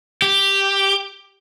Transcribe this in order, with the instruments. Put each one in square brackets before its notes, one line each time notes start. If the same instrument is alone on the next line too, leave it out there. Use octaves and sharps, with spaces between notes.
[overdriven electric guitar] G4